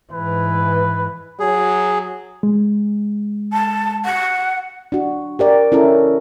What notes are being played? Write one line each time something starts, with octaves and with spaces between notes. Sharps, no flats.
G#2 E3 B4
F#3 G#4
G#3
A5
F#5
D4 F#4
G4 A#4 D5
C#4 E4 A4 A#4